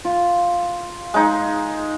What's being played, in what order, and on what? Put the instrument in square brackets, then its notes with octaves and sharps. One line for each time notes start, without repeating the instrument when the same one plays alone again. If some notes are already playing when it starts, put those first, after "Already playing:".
[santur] F4
[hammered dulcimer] G#3 D#4